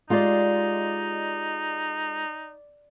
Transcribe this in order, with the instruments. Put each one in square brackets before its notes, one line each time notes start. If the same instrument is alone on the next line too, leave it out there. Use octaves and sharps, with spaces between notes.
[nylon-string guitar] G#3 F4 G4 [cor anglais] D#4 [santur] D5 C6